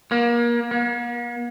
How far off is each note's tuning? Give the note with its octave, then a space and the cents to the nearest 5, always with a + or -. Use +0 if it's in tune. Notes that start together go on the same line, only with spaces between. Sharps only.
A#3 +30
A#3 +45